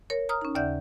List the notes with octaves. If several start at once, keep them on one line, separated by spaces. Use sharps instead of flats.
A#4 C#5
A#5 D#6 F6
C#4 D#4
D#2 C#3 D5 E5 F#5 G6